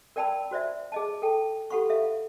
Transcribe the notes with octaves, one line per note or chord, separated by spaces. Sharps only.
A#4 D5 G5 A5 B5 E6
F#4 C5 D5 E5
G#4 D#5 A5
A4 G5 A5
G4 A4 F#5 B5 C#6
A4 E5 F5